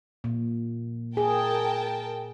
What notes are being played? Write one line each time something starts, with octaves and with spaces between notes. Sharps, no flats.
A#2
G#4 A#4 G5 A5